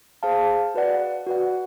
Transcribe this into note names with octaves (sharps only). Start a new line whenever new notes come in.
G#4 C5 F5 A5
F#4 B4 D5 F#5
F#4 B4 D5 F#5